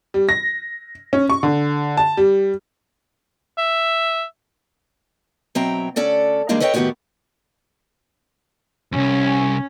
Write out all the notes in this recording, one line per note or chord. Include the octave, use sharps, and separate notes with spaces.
G3
A#6
C#4
C#6
D3
A5
G3
E5
B2 F#3 C4 E5 G5 A#5
D2 C#4 A4 D5 F#5
E3 G3 G#3 A#3 D4 D#4
A4 B4 C#5 D#5 F#5 G5
A2 D#3 B3 C#4 F#4 G4
C2 F2 C#4